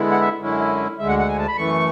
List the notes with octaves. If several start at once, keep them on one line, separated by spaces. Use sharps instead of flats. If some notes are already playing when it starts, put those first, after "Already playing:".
Already playing: D3 G#3 B3 E4
F#5
E5
F#2 D3 G#3 C#4 E4
D2 D3 G#3 E5
F#5
F#5
G#5
A5
B5
F#2 E3 A3 C#6